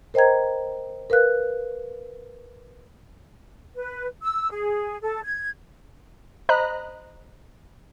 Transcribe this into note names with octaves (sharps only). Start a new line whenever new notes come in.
A#4 C5 D#5 G5 A#5 G#6
A#4 B4 F5 F#6
B4
E6
G#4
A4
G#6
C5 D#5 A#5 B5 F#6